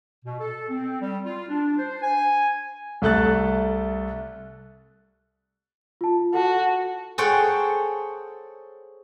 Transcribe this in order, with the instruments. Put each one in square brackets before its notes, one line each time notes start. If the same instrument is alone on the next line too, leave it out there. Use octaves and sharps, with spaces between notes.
[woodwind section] B2
A4
C4
G3
F4
D4
C5
G#5
[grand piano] C2 A3 A4 F#6 A6
[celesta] F4 A5
[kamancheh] F#4 [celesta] A4 F#5 A5
[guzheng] G#4 A4 C5 C#5 F#5 G5